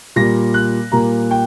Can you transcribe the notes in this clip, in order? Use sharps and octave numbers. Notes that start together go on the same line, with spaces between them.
A#2 G3 A#3 A#6
F#6
A#2 G3 A#3 A#5
G5